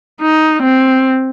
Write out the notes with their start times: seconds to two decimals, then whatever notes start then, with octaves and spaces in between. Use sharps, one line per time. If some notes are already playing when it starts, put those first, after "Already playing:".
0.22 D#4
0.63 C4